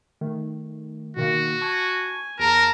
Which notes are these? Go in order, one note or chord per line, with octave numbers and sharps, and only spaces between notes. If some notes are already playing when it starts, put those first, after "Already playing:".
D#3 A3
B2 D#3 A#3 F#4
G#5 A5 C#6
E2 A#4 A5 A#5